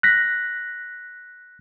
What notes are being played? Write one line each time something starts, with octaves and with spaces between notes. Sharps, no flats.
F#6 A#6 B6